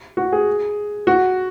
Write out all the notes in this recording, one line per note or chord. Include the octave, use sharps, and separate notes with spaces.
F#4
G#4
F#4